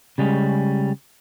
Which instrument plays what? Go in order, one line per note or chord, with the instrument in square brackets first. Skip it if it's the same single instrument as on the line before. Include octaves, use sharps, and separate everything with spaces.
[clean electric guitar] C#3 G3 G#3 C#4